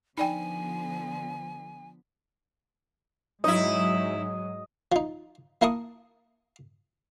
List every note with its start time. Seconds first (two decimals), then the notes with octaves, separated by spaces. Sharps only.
0.18 D3 F3 B3 D#4 D5 G5 G#5
3.44 G#2 F#3 G#3 D#4 E4 D#5
4.92 F3 D#4
5.61 A#3 E4 A#4 A5 C#6 D#6